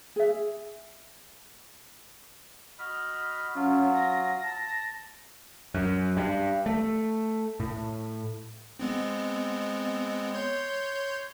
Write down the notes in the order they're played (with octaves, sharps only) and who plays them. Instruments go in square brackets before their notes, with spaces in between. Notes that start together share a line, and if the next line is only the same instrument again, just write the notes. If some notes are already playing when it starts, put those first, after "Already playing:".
[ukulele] G#4 E5
[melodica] F#4 D#5 B5 [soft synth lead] F6
[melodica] F#3 F4 [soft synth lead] C#4
[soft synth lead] A#6
[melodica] A5
[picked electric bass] F#2
G2
A3
A2
[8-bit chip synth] G#3 B3 C4
C#5 C6 G6